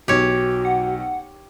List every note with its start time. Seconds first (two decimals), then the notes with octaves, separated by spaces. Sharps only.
0.08 B1 F#4 G4 C#5
0.65 F#5